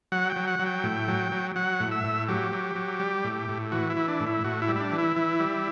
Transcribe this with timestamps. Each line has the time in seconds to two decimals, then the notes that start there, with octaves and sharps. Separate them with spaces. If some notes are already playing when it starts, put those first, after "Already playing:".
0.12 F#3 F#5
0.30 G5
0.36 F#3
0.47 F#5
0.59 F#3
0.66 G5
0.84 A2
1.08 F#3
1.32 F#3
1.56 F#3 F#5
1.80 A2
1.91 E5
2.04 A2
2.28 F#3 G4
2.52 F#3
2.75 F#3
3.00 G3
3.24 A2
3.49 A2
3.72 E3 F#4
3.90 E4
3.96 E3
4.08 D4
4.20 A2
4.27 E4
4.44 A2 F#4
4.62 E4
4.68 G3
4.76 E4
4.81 D4
4.92 E3
4.98 E4
5.16 E3
5.40 G3